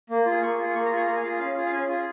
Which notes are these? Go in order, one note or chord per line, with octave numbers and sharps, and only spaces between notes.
A#3
F4 G#4
A#3 C#6
F4 G#4
A#3 C#6
A#5
F4 G#4 C#6
A#3 A#5
G#5
F4 G#4 F5
C#4 F5
F4 G#4
F5
C#4 G#5
F4 G#4